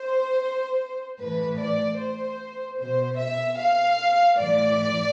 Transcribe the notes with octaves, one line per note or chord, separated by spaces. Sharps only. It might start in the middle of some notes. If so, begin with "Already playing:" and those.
Already playing: C5
A2 E3 B4
D5
C5
B2 C5
E5
F5
A2 E3 D5